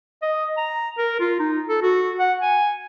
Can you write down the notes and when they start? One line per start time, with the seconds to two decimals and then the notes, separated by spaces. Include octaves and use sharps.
0.22 D#5
0.57 A#5
0.98 A#4
1.20 F4
1.40 D#4
1.69 A4
1.82 F#4
2.19 F#5
2.42 G#5